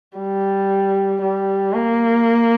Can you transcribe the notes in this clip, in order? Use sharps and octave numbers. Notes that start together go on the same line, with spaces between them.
G3
G3
A#3